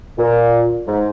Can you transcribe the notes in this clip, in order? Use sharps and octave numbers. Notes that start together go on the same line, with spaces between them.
A#2
G#2